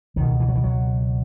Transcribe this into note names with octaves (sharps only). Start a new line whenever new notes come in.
C#2 B2 D#3
E3
F#3
E3
F#3